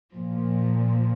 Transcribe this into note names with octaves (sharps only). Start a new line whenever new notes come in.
A#2 F3